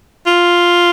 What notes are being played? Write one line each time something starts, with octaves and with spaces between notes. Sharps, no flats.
F4